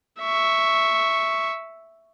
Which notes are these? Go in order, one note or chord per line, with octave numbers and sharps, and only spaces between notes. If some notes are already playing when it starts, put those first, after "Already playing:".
E5 C#6